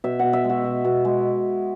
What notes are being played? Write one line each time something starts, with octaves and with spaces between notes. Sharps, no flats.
B2 E5
B2 F#5
E5
G#3
F#4
B2
B2
G#3